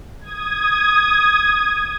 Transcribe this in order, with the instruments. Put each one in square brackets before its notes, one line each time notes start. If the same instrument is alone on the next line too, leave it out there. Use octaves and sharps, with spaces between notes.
[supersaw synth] D#6 G#6